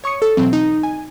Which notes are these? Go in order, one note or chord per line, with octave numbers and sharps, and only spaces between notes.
C#5 C#6 D#6 C#7
A4
B2 E3 F#3 C4
D#4
G#5